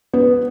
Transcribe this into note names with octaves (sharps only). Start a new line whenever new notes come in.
B3